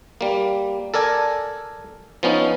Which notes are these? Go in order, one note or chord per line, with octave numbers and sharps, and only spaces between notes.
G3 A#3
A4 A#4 D5 G#5
F3 B3 C#4 D#4